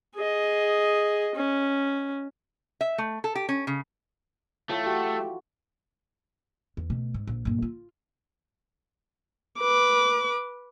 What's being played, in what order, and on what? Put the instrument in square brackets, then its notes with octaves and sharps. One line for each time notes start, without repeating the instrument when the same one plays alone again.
[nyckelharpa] G#4 D#5
C#4
[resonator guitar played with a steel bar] E5
A3
A4
G4
C#4
C#3
[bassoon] A2 [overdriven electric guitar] A3 [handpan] E4 F4 A4
[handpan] F#4 [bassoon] G4
[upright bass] E2
B2 A3
G#2
A#1
G2 A#2
F4
[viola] B4 D6